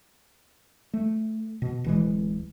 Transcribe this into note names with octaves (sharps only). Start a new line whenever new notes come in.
A3
B2
D1 E3 G#3